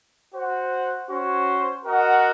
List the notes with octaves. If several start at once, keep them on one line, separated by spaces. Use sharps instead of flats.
F#4 C5 F#5
C#4 F#4 C5
F#4 A#4 D#5 F#5